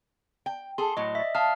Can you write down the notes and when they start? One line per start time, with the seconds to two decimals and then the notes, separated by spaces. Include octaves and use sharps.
0.46 G5
0.78 G#4 A4 C6
0.97 A2 F#3 D#5
1.15 D5 E5
1.35 F5 A5 D#6 F6